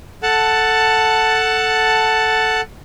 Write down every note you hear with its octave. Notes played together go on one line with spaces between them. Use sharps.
A4 F#5 A5